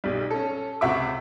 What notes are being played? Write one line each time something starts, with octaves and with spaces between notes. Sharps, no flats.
B1 G3
C#4 A4
C#2 C3 F#4 E5 C#6 D6